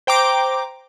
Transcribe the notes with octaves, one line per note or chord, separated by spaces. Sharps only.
C5 G5 A#5 D6